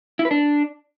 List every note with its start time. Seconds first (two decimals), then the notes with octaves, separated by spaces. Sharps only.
0.19 E4
0.25 B4
0.31 D4